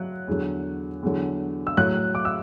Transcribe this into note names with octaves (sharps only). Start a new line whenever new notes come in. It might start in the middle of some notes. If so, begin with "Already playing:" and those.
Already playing: F#3 F#6
E2 D3 F#3
E2 D3 F#3
E6
A2 F#3 F#6
D6
E6